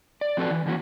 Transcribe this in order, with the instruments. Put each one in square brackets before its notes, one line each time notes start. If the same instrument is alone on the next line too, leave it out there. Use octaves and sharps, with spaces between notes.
[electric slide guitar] D5
F3 C4 F#4 A4 B4 D5
E3
D#3 E3 A#3 C#4 F#4